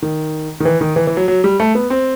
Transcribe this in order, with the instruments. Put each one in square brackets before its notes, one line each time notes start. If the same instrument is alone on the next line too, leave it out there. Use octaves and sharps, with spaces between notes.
[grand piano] D#3
D#3
E3
D#3
E3
E3
F#3
F#3
G3
A3
B3
C4